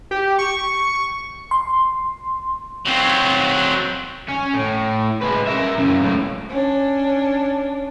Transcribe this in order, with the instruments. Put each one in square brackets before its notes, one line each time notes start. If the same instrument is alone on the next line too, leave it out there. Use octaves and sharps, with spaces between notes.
[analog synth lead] G4
C#6
[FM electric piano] C6
[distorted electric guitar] F#3 C4
[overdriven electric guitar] C#4
A2
G#3 B4
A#4 E5
F#2 C#3
C#2 A2
[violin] C#4 D4